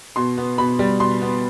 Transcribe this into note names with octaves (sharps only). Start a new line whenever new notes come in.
B2 C6
B3
B2 B5
G3
B2 C6
B3